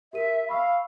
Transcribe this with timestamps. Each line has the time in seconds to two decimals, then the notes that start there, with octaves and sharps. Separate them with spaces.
0.13 G4 A#4 E5 D#7
0.49 F5 B5 C#6 E6